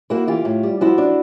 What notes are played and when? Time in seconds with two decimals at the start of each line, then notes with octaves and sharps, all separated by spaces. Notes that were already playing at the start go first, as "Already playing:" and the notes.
0.10 A#3 E4 F#4
0.27 E3 F4 G4
0.45 A2
0.63 G3
0.81 F3 E4 F#4
0.98 D4